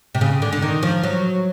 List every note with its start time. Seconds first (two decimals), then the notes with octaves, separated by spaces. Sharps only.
0.15 C3
0.21 C#3
0.42 D3
0.53 D3
0.62 D#3
0.83 F3
1.03 F#3